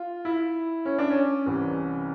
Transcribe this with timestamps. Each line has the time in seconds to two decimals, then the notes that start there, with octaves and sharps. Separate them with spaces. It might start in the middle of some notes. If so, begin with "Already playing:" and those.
Already playing: F4
0.25 E4
0.85 C#4
0.99 D4
1.10 C#4
1.46 C2 C3 E3